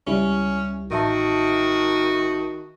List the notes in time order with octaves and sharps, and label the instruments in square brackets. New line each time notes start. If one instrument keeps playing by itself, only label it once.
[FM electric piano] C#2 G3 E4 [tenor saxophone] C#4
[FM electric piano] A1 E5 A5 [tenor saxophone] D#3 [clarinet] F#4